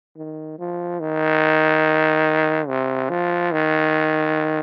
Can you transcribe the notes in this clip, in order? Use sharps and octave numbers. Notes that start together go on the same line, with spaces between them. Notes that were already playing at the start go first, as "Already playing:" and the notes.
D#3
F3
D#3
C3
F3
D#3